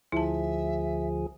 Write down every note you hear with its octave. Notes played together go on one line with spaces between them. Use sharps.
D2 F3 E4 G#4 E5 A5